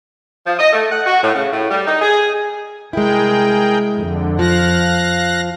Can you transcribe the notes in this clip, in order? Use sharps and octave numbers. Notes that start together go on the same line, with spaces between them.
F3
D#5
A3
F#5
F#4
A2
C#3
A2
G3
D#4
G#4
C2 G#3 E4 G#4 A#4 G5
F2 D3
F3 F5 F#6 A#6